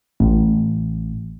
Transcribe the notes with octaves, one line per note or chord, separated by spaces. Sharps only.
A1